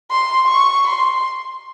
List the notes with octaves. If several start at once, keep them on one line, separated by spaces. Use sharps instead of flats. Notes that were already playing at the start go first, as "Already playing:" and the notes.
C6
C#6
C6